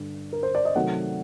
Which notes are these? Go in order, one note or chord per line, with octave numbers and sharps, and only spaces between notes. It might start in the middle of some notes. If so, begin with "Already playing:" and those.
Already playing: G2 D3
A#4
C5
D5
D#5
C3 D#3 F#3 A3 F#5